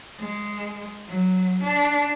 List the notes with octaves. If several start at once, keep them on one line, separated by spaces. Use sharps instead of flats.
G#3
F#3
D4